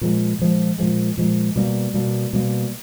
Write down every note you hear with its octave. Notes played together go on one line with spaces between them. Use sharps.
A#2 F3 G#3
A#2 F3 G#3
A#2 F3 G#3
A#2 F3 G#3
B2 G3 A#3
B2 G3 A#3
B2 G3 A#3